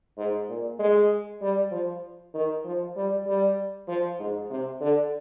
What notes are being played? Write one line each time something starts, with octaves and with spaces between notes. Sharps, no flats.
G#2
A#2
G#3
G3
F3
D#3
F3
G3
G3
F3
G#2
C3
D3